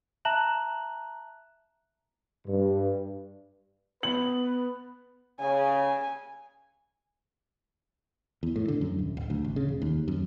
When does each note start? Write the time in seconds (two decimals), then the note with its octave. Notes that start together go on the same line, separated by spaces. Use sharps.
0.25 E5 A5 A#5 F#6 E7 F#7
2.47 G2
4.03 B3 B4 F#7
5.40 C#3 G#5
8.43 E2
8.56 A2
8.68 D3
8.81 F#2
8.98 D#1
9.17 D1
9.30 D2
9.44 A1
9.56 C#3
9.68 E1
9.82 D#2
10.08 F#2